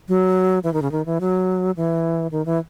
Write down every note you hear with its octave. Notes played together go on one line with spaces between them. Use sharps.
F#3
E3
D#3
C#3
D#3
E3
F#3
E3
D#3
E3